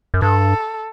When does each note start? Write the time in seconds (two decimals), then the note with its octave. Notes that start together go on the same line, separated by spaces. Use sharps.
0.14 F#2
0.22 G2 A4